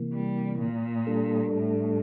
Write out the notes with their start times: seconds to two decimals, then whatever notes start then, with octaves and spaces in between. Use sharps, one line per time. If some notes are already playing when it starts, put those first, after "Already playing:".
Already playing: C3 E3 A#3
0.14 G3
0.59 A#2
1.07 G3 D4 A4
1.53 A2